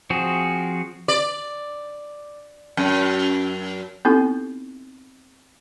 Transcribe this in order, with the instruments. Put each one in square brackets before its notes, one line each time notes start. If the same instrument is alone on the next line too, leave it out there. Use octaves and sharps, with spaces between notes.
[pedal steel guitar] F3 C4 F#4 G#4
[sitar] D5
F#2
[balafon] B3 C4 D#4 E4 G4 A4